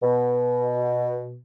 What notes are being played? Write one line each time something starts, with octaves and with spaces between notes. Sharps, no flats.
B2